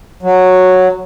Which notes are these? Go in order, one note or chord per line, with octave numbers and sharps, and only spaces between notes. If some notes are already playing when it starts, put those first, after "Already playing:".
F#3